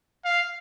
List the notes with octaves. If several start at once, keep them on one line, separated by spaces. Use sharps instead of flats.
F5